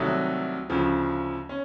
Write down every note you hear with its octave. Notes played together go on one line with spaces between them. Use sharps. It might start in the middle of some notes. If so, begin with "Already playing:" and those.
Already playing: C2 C3 D#3 F#3 A3 D#6
D2 C#3 F3
C#4